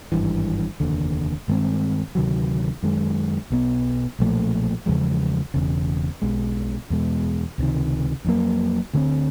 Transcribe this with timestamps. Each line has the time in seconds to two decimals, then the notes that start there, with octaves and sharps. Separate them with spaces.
0.12 G#1 G2 E3
0.80 F1 D#2 D3
1.48 G2 D#3 G#3 C4
2.15 D2 C3 D#3 F#3
2.83 F#2 D#3 G#3
3.50 B1 B2 G3 B3
4.19 B1 A#2 F3 A3
4.86 E2 C#3 F3 G#3
5.54 E1 E2 C#3
6.22 B1 B2 G#3
6.90 E2 B2 G#3
7.58 C#2 C3 D#3
8.24 F2 C#3 F#3 A#3
8.93 D2 D3 G3 C4